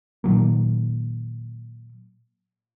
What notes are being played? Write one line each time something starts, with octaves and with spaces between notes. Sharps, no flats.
A#2 D#3 F#3 A#3